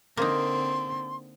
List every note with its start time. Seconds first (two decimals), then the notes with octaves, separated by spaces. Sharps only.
0.17 D3 A#3 C4 D#4 C6